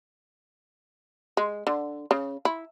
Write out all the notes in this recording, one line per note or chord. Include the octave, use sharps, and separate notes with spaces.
G#3
D3
C#3
E4